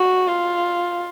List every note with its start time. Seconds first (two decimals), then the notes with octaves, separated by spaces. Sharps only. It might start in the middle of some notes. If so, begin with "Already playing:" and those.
Already playing: F#4
0.28 F4